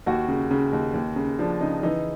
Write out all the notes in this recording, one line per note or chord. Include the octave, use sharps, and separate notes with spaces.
D#2 F#4
C#3
C#3
D#2
D#2
C#3
F3 D4
C#3 D#4
E3 D#4